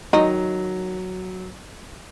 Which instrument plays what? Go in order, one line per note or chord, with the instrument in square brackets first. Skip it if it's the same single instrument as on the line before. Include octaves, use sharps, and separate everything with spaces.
[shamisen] D#3 D#4 [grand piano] F#3